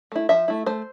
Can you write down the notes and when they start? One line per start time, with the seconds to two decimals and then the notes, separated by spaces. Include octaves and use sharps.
0.12 A3 E4
0.29 F3 E5
0.48 A3 E4
0.66 A3 C5